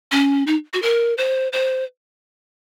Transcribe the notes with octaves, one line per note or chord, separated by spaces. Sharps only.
C#4
D#4
F#4
A#4
C5
C5